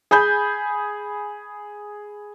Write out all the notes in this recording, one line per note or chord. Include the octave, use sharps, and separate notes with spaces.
G#4 G#5 B5 G6